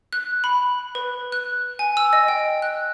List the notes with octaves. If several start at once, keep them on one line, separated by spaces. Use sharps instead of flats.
F#6
B5
B4
F#6
G#5
E6
D#5
G5
F#6